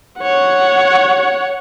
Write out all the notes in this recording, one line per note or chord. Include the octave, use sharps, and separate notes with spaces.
C#5 F#5